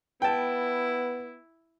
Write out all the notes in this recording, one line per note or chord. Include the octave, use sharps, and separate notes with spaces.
B3 E4 G5 A5